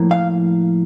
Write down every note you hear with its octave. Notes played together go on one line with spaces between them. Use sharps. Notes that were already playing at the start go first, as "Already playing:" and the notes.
Already playing: A2 F3 A#3
F5